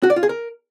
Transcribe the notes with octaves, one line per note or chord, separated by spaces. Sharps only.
F#4
D5
F4
G#4
A#4